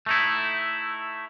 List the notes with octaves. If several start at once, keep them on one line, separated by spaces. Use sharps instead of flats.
A3 D#4 E4